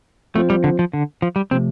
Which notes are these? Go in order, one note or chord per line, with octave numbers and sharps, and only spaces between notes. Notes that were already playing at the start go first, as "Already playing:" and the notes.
F3 A3 C4 F4 C5
G3
D3
F3
D3
F3
G3
C3 F3 A3 C4